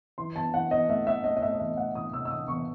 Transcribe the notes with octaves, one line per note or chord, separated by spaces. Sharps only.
E3 C6
E2 A5
E3 F#5
E2 D#5
A3 E5
A3 E5
A3 D#5
D#5
A3 E5
D#5
E2 E5
A3 F#5
E3 D#6
C3 E6
E6
E2 D#6
E2 C#6